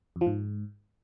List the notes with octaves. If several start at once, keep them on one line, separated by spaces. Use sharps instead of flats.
F2
F3
G#2